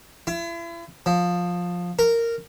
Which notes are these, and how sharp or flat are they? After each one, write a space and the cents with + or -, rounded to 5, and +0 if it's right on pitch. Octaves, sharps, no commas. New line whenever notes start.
E4 +40
F3 +15
A#4 -10